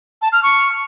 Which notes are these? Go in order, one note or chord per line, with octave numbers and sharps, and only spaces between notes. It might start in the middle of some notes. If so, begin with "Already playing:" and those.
A5
F6
C#6